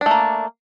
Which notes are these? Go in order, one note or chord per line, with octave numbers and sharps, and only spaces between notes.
A3 A#3 D4